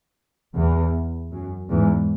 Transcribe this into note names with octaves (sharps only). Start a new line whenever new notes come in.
E2
F#2
E2 G#2